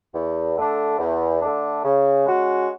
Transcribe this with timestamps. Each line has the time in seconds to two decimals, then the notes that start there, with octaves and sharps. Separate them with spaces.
0.14 E2
0.57 D3 A3 D4
0.99 E2
1.42 D3 A3 D4
1.84 C#3
2.26 G#3 C#4 F#4